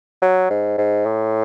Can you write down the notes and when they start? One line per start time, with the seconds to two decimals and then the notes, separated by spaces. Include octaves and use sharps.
0.22 F#3
0.50 G#2
0.78 G#2
1.06 A2